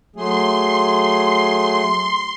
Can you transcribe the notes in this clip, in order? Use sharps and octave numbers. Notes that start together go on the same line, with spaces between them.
F#3 A3 G#4 C6